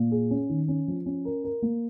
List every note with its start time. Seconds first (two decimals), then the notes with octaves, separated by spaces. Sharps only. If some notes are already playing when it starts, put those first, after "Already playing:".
Already playing: A#2
0.12 G#4
0.31 C#4
0.49 D#3
0.68 C#4
0.88 F3
1.06 C#4
1.25 A#4
1.44 A#4
1.62 A#3